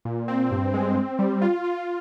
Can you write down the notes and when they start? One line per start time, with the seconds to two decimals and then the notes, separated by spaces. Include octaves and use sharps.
0.05 A#2
0.28 C4
0.51 G2
0.74 G#3
0.97 C4
1.19 G3
1.42 F4
1.64 F4